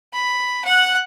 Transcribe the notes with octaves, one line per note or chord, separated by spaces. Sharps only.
B5
F#5 F#6